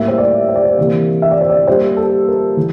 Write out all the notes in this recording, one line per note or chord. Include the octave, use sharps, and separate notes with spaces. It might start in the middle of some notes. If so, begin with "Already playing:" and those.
Already playing: A2 G3 A#3 E5
C5
D5
C5
D5
C5
C3 E3 A#3
E5
D5
C5
D5
A#2 G3 A#3 C5
A4
A#4
E3